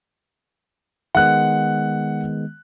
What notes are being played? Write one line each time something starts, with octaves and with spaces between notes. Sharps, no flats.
D#3 G#3 B3 F#5 F#6